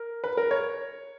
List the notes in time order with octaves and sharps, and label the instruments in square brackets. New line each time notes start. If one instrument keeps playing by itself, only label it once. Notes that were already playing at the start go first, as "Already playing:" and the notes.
Already playing: [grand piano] A#4
B4
A#4
C#5